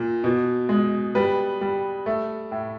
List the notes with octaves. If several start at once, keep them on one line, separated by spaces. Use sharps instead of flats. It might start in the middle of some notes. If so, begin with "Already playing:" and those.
Already playing: A#2
B2
G#3
G3 B4
G3
A3
A2